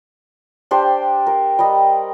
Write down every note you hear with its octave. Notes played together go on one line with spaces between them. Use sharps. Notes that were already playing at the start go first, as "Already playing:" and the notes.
D4 G4 C5 D5
A#4
G3 D#5